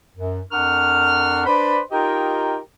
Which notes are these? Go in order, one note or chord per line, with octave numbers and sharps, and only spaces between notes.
F#2
F2 D4 A#4 F#5 C#6 F6
D4 B4 C5 D5 B5
D#4 F4 G4 A#4 D#5 G5